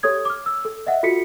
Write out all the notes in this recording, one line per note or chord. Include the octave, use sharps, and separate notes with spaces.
G4 A4 C#5 D#6 G#6
D6 F6
E6
A4
D#5 E5 F#5
F4 F#4 A4 B6 C#7